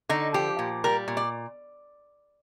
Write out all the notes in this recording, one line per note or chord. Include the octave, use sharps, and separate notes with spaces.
D3 D#4
F3 G4
A#2
G3 A#4
A#2
D5